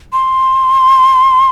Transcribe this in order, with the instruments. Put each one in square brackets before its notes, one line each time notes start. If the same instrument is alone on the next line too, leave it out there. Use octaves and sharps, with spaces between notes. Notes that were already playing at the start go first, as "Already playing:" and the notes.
[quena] C6